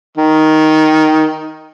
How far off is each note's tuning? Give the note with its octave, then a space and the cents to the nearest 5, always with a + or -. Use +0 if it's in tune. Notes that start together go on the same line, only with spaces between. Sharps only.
D#3 +5